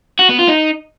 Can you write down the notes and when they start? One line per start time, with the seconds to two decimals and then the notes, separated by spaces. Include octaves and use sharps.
0.19 F#4
0.29 B3
0.39 F4
0.48 D#4